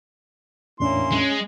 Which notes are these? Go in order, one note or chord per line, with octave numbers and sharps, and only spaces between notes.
E2 A2 A#3 C#4 D4 E4 C6
G#3